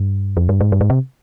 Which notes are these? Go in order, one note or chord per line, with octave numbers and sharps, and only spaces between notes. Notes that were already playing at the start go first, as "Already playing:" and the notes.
Already playing: G2
F2
G2
G#2
G2
G#2
C3